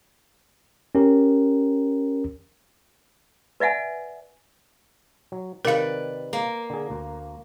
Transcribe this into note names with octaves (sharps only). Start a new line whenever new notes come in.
C#4 G4 A#4
B4 D5 E5 F#5 G#5
F#3
C3 D#3 A#4 B4 D5 F5
A#3
D3 G#4
D2